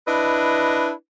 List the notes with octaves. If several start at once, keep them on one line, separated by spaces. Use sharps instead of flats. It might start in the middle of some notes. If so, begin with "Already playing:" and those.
D4 E4 B4 D#5